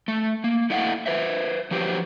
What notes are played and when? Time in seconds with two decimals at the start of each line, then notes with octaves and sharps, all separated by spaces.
0.08 A3
0.44 A#3
0.70 A3 E4 D#5 F5 F#5
1.06 B4 C5 E5
1.71 F3 F#3 G4 C5